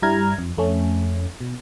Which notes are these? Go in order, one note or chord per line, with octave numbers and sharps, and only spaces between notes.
G2 G3 E4 A#5 F6 G#6
F2
F2 A3 C#4
B2